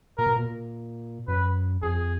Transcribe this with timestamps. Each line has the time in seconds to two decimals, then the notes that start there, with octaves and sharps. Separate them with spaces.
0.18 A#2 A#4
0.27 B2
0.36 A#2
1.28 F#2 B4
1.82 F2 G#4